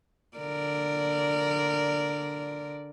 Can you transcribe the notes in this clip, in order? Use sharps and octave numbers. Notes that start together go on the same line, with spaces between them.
D3 A#4 D5